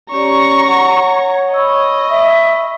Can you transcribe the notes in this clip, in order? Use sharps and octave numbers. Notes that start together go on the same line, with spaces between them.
C#4 G4 C#5 D5 A#5 C#6
F#5
D#5 B5 C#6 E6
E5